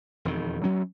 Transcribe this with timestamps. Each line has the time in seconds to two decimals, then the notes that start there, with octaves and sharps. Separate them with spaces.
0.25 E1 F2 D#3
0.64 D2 F#3 C#4